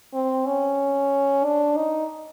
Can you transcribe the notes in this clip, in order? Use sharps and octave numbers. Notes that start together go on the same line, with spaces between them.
C4
C#4
D4
D#4